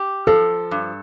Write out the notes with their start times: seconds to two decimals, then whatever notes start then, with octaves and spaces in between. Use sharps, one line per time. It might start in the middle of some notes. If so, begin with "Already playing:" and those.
Already playing: G4
0.27 F3 A4
0.71 G2